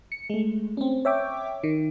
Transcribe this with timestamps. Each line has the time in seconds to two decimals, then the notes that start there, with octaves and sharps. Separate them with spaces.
0.12 C#7
0.30 G#3 A3
0.77 C4 C#4
1.05 C#5 E5 G5 D6
1.64 D#3